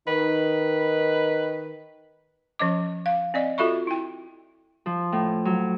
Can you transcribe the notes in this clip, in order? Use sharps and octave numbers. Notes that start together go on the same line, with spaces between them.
D#3 B4
F3 C#4 D#5 D6
F5
C4 D5 D#5
F4 F#4 A4 E5 B5 C#6
E4 G5
F3
A2
F#3